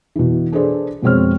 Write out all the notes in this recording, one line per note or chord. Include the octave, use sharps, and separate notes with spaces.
B2 E3
D4 G#4 A4 B4 C5 D5
F2 B2 G#3 C4 C#5 F6